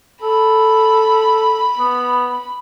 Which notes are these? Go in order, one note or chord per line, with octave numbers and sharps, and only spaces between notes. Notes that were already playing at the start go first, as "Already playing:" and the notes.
A4 B5
B3